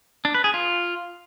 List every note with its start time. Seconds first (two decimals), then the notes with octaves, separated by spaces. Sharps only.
0.25 D4
0.34 B4
0.44 G#4
0.54 F4